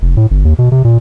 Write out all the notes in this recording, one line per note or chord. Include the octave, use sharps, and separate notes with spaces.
F1
A2
G1
D#2
B2
C3
A#2